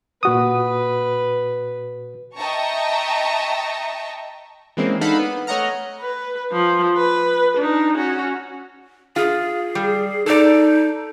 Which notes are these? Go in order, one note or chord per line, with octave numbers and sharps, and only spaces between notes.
A#2 F#4 B4 D#6
D#5 E5 G5 A5 A#5 C#6
E3 G#3 A#3 C4 C#4
D4 D#4 A4 F5 F#5 B5
B3
A3 C#5 D#5 F#5 A#5 F6
B4
F3
B4
D4 D#4
C#4 F#4
F4 G#4
G3
D#4 A4 D5